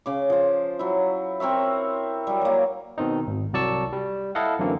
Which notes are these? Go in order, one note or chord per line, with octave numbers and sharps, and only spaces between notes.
C#3 D6
F3 C5
F#3 E4
C4 A#4 C#5 E5
F#3 G3
F#3 A#3
B2 D#3 C4 D#4
G#1
C2 F#3 D5 A5 C#6 E6
G3
E4 A4 D#5 F5 F#5
F#2 D3 E3 A#3 C4